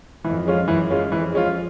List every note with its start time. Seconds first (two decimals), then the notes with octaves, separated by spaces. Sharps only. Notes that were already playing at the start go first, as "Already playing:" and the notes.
0.24 F2 E3
0.46 G#3 C#4 F4
0.68 F#2 E3
0.90 G#3 C#4 F4
1.12 F2 E3
1.34 G#3 C#4 F4